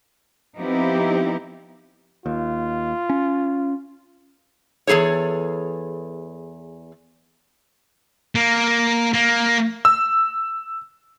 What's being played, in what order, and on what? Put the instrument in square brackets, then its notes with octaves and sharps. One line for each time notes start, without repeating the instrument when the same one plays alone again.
[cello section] F3 B3 C4 D#4 E4 G4
[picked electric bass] D#2 [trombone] F4
[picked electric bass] C#4
[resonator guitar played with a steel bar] E2 G3 G#4 A4 C#5
[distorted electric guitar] A#3
A#3
[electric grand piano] E6